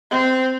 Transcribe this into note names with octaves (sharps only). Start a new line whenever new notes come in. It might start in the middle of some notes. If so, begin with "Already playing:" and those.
C4